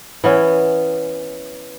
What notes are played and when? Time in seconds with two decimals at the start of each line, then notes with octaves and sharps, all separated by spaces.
0.24 E3 B3 C#4